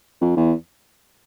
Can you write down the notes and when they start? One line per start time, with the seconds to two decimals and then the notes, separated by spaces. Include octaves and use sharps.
0.21 F2
0.36 E2